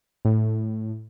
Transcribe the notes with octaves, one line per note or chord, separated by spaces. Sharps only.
A2